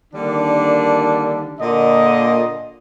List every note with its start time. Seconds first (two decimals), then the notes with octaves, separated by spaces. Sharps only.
0.14 D3 D#3 G3 A#3 D4
1.60 A#2 D3 D#5